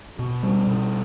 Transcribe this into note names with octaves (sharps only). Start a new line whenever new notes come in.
B2
G3
B2